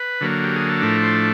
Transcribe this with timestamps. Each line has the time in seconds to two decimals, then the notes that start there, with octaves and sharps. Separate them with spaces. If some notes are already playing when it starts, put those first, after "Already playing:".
Already playing: B4
0.21 D3 F#3 A#3
0.44 G4
0.56 G#4
0.69 A4
0.82 A2 F3 A3 D4 A#4
1.03 C5